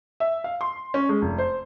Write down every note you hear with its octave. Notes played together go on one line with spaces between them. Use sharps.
E5
F5
C6
C#4
G#3
F1
C5